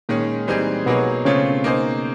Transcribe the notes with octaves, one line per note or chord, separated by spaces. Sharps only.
A#2 D#3 G#3 A#3 C#4
E3 G3 C4 D#4 G#4
B2 F#3 A#3 B3 D#4 G#4 C#5
C#3 A3 C4 C#4 F4 G#4 C#5
A#3 D#4 G#4 C5